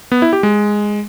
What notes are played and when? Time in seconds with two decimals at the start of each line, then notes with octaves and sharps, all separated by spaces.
0.12 B3
0.22 E4
0.33 G4
0.43 G#3